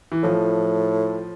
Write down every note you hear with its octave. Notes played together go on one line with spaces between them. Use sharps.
E3
A2 F3